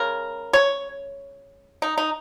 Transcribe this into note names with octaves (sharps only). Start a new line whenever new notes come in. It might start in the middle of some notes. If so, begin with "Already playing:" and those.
Already playing: C#3 G#3 A#4
C#5
D#4
D#4